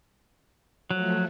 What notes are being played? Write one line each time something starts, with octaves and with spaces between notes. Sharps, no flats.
F3 F#3 A3